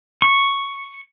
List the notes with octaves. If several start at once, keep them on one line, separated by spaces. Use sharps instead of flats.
C#6